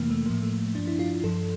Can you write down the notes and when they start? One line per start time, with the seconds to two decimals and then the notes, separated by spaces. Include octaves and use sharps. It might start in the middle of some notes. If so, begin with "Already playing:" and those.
Already playing: F2 C3 E3 A3 A#3
0.10 A3
0.26 A2 F3 A#3
0.42 A3
0.75 G2 F3 D4
0.87 E4
0.99 F4
1.24 G2 F3 A4